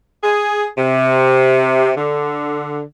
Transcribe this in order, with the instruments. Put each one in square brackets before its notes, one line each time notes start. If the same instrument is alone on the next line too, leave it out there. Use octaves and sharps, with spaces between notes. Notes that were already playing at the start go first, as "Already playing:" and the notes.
[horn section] G#4
C3
D3